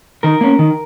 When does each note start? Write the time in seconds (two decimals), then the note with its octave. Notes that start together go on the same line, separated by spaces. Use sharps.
0.23 D#3 A#4
0.41 A#3 C#4
0.59 D#3